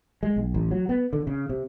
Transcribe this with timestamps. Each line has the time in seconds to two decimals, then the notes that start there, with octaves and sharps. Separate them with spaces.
0.23 G#3
0.36 B1
0.54 A1
0.71 F#3
0.89 B3
1.13 D3
1.27 C#3
1.49 C3